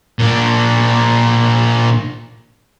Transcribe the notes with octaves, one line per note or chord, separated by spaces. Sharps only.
A#2 D4